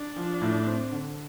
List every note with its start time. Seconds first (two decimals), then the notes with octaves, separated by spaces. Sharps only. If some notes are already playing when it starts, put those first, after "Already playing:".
Already playing: D4
0.16 F3
0.41 A2
0.67 C4
0.92 D3